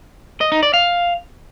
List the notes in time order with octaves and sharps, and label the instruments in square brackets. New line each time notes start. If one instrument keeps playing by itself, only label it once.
[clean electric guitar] D#5
D#4
D5
F5